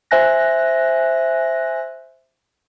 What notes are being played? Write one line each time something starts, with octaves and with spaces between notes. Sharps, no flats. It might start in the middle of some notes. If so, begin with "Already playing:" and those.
C5 E5 G#5 F#6 A#6